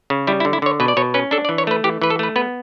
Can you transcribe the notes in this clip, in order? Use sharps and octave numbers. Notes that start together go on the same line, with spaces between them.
C#3
G3 E4
E4
D3
E4
D3 C#5
B2 B4
D5
B2 C#5
C#4 B4
D4 A4
D5
E3
C#5
A3 B4
E3 G4
E3 B4
A4
A3 B4
B3 B4